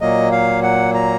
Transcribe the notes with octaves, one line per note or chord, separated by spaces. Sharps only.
A#2 F#3 A#3 D#5
F5
F#5
A#5